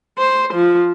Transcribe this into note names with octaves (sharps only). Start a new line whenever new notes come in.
C5
F3